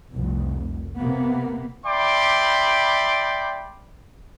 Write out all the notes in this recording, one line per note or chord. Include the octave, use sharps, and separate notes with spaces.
F1 C2
C3 A#3 B3
D5 E5 G5 B5 C6 D6